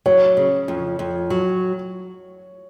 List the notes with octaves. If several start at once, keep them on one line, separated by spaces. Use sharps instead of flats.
F#3 C#5
C#3
F2
F2
F#3